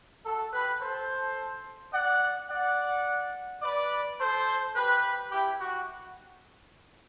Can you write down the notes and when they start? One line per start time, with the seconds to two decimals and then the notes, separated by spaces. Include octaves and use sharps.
0.24 F#4 A4
0.53 G4 B4
0.80 A4 C5
1.93 D5 F#5
2.50 D5 F#5
3.62 B4 D5
4.19 A4 C5
4.76 G4 B4
5.32 E4 G4
5.61 F#4